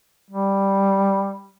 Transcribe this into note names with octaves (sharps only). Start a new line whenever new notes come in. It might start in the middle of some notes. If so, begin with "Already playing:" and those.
G3